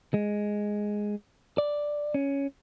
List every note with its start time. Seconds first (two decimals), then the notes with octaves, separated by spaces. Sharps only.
0.14 G#3
1.58 D5
2.14 C#4